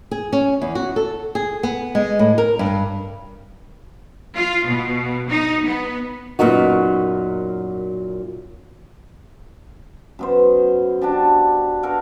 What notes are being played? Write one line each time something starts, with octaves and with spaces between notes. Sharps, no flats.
G#4
C#4
E2
F#4
A4
G#4
B3
G#3
A2
A#4
G2
F4
B2
D#4
B3
F#2 A#2 B3 D#4 F#4
F#2 B3 C5
D4 F#4 G4 A5
F#4 A4 A#4 F5